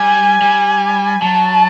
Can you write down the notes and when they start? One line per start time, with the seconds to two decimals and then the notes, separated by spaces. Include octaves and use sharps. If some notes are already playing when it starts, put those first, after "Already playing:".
Already playing: G3 G#5
0.42 G3
1.22 F#3 A5